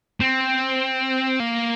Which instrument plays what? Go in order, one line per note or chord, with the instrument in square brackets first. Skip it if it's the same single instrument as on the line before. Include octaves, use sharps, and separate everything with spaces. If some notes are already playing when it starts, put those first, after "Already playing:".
[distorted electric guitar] C4
A#3